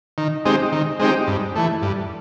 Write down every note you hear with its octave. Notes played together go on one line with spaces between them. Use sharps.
D#3
G#3 C4 D#4 G4
D#3
G#3 C4 D#4 G4
G2
E3 A3
G2